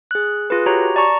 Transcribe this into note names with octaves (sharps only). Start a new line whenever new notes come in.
G#4 F#6
F4 G#4 B4
F#4 G4 C#5 A#5
D5 A5 A#5 C#6